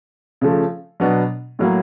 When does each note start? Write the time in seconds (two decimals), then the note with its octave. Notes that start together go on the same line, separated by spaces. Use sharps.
0.41 C#3 F3 A3
1.00 B2 F#3 B3 D4
1.59 A2 F#3 A#3